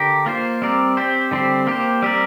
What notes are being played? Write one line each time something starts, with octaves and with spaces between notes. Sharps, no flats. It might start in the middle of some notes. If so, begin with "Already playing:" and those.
Already playing: D3 G4 A#4
A#3 F4 C5
G3 C4 A#4 D5
C4 G4 C5
D3 G3 C4 G4 C5
A#3 G4 C5
G3 C4 G4 A#4 D5